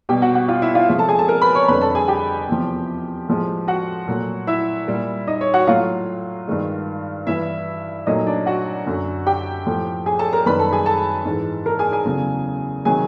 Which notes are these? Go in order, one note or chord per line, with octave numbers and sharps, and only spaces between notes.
B2 G3 G4 G5
F#4 F#5
F#4 F#5
F4 F5
E4 E5
F4 F5
C3 F3 G#3
A4 A5
G#4 G#5
A4 A5
A#4 A#5
B4 B5
C#5 C#6
F2 D3 G3 B4 B5
A4 A5
G#4 G#5
G4 G5
E2 C3 F3
A2 F3 G#3
F#4 F#5
A#2 F#3 A3
E4 E5
A#2 G3
D#4 D#5
C#5
F#4 F#5
A2 F#3 A3 F4 F5
G2 D#3 G#3
G2 E3 G3 E4 E5
A#2 F#3 A3 D#4 D#5
D4 D5
F#4 F#5
F#2 D3 F#3
G4 G5
A2 F3 A3
G#4 G#5
A4 A5
A#4 A#5
F#2 D#3 G3 B4 B5
A4 A5
G#4 G#5
A4 A5
G#2 E3 G#3
A#4 A#5
G#4 G#5
G#4 G#5
E2 C#3 F#3 A3
C3 D#3 F#3 G#4 G#5